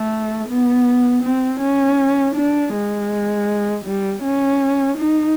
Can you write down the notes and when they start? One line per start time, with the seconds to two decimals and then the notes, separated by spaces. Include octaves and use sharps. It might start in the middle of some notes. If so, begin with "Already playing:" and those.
Already playing: A3
0.48 B3
1.22 C4
1.59 C#4
2.35 D4
2.73 G#3
3.85 G3
4.23 C#4
4.97 D#4